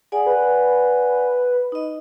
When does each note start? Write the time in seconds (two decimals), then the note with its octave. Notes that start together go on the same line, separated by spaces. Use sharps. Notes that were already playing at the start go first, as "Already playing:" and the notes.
0.12 G#4 D5 F#5 G#5
0.26 B4
1.72 D#4 D#5